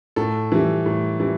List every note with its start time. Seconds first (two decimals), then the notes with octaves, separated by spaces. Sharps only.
0.16 A2 A4
0.52 E3 G3
0.86 A2
1.20 E3 G3